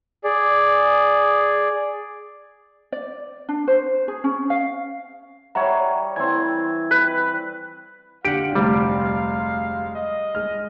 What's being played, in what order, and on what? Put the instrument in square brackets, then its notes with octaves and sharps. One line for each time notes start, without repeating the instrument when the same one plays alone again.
[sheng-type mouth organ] G#4 D5
[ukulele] D5
D4
C5
G#4
C#4
F5
[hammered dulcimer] G3 C#5 [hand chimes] E5 F#5 A#5
[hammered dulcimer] E3 C4 [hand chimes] G#6
[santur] B4
[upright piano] D3 D7 [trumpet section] G#3 F5 [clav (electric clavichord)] G4 F#5
[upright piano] F1 D2 C3 [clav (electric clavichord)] G3
[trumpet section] D#5
[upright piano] G#3 F6